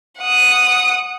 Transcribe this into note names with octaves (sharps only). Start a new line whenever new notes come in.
F#5 D#6